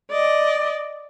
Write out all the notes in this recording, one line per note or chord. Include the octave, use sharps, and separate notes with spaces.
D5 D#5